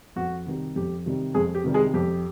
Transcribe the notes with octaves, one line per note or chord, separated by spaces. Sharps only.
F2 F#4
C3 D#3 G3
F2 G4
C3 D#3 G3
F2 G#3 G#4
G4
C3 D#3 G3
G#3 G#4
F2 G4